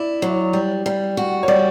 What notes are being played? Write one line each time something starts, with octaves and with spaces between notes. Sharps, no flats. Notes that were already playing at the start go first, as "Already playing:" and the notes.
Already playing: E4 D5
F#3
G3
G3
F#4
C#5
G3 D5